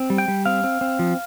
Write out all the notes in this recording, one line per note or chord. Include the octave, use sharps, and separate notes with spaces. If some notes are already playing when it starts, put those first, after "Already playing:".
Already playing: C4
G3
G5
G3
C4 F5
C4
C4
F3